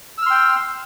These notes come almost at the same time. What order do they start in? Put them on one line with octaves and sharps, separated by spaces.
E6 F6 C6 G5